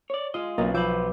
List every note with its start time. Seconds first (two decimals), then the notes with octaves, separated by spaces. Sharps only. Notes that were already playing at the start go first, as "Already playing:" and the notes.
0.10 C#5 D5
0.34 G#3 F4 D#5
0.58 B1 A#3 C4 C#4 F4 D#5
0.74 F3 B3 C5 B5 D6 E6 G6